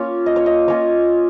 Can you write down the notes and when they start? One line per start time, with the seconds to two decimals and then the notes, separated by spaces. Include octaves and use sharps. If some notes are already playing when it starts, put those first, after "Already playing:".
Already playing: A#3 C#4 F4 C#5
0.26 D#5
0.36 C#5
0.46 D#5
0.68 A#3 C#4 F4 C#5